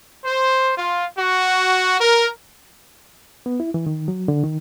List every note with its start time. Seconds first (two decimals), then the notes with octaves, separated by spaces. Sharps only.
0.24 C5
0.77 F4
1.17 F#4
2.01 A#4
3.46 B3
3.60 E4
3.74 E3
3.87 D#3
4.08 F#3
4.28 D3
4.44 D#3